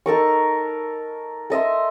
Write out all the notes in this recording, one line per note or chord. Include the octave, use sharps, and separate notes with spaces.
D#4 A4 A#4 C#6
A4 D#5 E5 C6